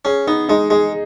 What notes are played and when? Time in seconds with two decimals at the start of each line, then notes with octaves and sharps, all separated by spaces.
0.05 C#4 G#4
0.27 B3 D#4
0.49 G#3 D#4
0.70 G#3 G#4